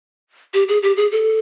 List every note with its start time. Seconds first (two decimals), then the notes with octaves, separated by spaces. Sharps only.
0.54 G4
0.68 G#4
0.83 G4
0.97 G#4
1.12 A4